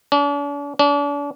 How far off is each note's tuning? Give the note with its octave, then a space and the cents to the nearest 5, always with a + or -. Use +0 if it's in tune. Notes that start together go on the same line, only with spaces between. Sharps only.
D4 -45
D4 -40